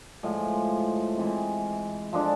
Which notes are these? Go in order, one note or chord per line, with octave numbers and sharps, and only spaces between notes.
A2 F3 G#3
C3 E3 G#3
F3 G#3 D4 A4